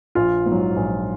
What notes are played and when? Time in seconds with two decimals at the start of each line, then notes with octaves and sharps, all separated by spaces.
0.15 A#1 F4
0.46 G#2
0.52 F#3
0.77 A#1